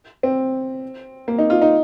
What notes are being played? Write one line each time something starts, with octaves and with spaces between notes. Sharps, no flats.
C4
A#3
D#4
F4
D#4